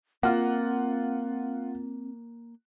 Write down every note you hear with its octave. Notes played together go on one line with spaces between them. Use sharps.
A#3 C4 F4 F#5